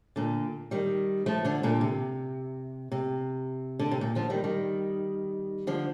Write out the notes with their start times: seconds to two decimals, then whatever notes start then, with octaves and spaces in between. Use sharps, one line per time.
0.16 A#2 D3
0.71 D#3 G3
1.26 F3 A3
1.45 D3 F3
1.63 A#2 D3
1.81 C3
2.91 C3
3.79 D3
3.91 C3
4.01 A#2
4.15 D3 F3
4.30 D#3 G3
4.44 D#3 G3
5.67 D3 F3